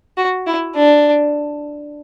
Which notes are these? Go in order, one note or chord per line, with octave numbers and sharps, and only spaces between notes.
F#4
E4
D4